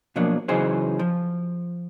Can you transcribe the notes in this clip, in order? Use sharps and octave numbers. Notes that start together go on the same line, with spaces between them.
B2 F3 F#3 A#3 D4
C#3 E3 F#3 D#4 G#4 C5
F3